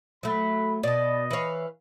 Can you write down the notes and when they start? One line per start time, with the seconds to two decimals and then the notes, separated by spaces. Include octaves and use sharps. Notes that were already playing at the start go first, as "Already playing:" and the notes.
0.23 F#3 A3 B5
0.83 B2 D5 D#5 A5
1.31 E3 B4 C#5 F5